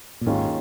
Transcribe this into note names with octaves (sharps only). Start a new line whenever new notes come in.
A#2
G#1 D#2 G#2 D#3 G#3 C#4 F4